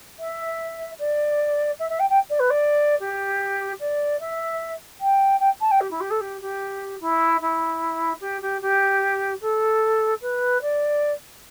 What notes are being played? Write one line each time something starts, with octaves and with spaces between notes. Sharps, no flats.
E5
D5
E5
E5
G5
G5
D5
B4
D5
G4
D5
E5
G5
G5
A5
G5
G4
E4
G4
A4
G4
G4
E4
E4
G4
G4
G4
A4
B4
D5